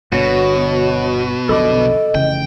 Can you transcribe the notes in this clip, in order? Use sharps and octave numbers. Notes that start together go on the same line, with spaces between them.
G1 B2 D3 B3 F#4 C#5
B1 F2 D3 A4 D#5 B5 D6
F1 C#3 E3 G5